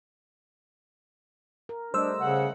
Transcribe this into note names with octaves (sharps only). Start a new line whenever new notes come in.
A#4
G3 A3 D4 C5 D#5 E6
C#3 F#5